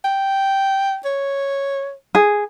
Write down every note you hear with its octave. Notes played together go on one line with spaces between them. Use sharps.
G5
C#5
G#4